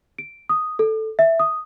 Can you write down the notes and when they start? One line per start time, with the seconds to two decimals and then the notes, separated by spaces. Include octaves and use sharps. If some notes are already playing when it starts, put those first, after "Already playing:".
0.18 D7
0.49 D#6
0.79 A4
1.19 E5
1.40 D#6